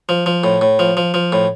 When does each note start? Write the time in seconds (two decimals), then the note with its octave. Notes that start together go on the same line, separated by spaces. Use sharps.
0.09 F3
0.26 F3
0.44 A2
0.61 A2
0.79 F3
0.97 F3
1.14 F3
1.32 A2